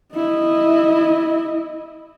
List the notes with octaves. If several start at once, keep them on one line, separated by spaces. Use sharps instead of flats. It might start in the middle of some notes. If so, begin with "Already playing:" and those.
E4 D#5